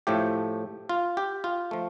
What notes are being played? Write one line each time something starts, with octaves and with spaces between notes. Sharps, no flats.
A2 F3 A3 G4
F4
G4
F4
F3 A3